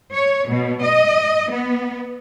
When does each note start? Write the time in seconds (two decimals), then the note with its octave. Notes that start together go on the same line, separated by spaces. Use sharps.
0.13 C#5
0.48 B2
0.82 D#5
1.52 B3